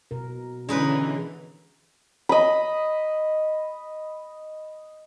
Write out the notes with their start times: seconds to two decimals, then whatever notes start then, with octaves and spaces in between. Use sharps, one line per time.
0.11 B2 A#4
0.69 D3 E3 G#3 C#4 D#4 B4
2.29 D#5 B5